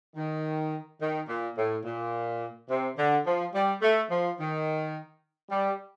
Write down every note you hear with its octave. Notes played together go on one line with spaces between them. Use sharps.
D#3
D#3
A#2
A2
A#2
C3
D3
F3
G3
A3
F3
D#3
G3